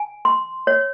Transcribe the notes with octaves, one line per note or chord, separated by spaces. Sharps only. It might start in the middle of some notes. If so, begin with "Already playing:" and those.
Already playing: G#5
C6
C#5